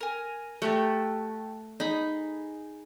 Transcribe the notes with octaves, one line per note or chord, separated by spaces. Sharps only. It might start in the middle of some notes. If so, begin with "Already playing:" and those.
A#4 G#5
A3 F#4 G4 A#4 A5
D#4 G#4 B5